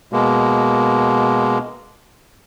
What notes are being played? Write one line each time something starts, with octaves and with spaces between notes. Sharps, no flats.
B2 G#3 A#3